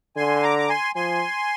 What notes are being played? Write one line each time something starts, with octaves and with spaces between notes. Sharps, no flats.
D3 G#5 C6
A#5 D6
D6
G#5 C6
F3 G#5 C6